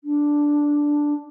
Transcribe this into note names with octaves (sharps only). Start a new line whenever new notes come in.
D4